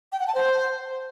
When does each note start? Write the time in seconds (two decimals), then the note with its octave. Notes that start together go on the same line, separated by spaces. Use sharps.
0.12 G5
0.20 F#5
0.27 A5
0.35 C5